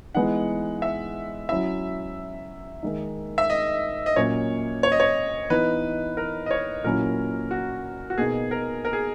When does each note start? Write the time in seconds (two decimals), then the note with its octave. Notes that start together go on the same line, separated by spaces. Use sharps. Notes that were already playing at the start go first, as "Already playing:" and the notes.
0.15 E3 G#3 B3 D#4 F#5
0.82 E5
1.49 F#3 C#4 E4 E5
2.83 D#3 G#3 D#4
3.38 E5
3.50 D#5
4.06 D#5
4.16 A#2 F#3 C#4 C#5
4.83 C#5
4.92 D#5
5.00 C#5
5.50 E3 B3 D#4 B4
6.17 A#4
6.46 D#5
6.51 C#5
6.84 A#2 F#3 C#4 E4 A#4
7.51 F#4
8.10 F#4
8.18 B2 A#3 D#4 G#4
8.51 A#4
8.85 A#4
8.93 G#4